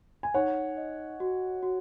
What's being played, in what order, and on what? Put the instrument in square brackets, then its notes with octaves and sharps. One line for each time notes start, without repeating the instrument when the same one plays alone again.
[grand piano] G#5
[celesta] D#4 [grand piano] C#5 F#5
[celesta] D#5
F#4
F#4